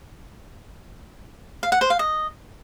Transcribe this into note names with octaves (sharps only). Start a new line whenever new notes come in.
F5
F#5
C5
F5
D#5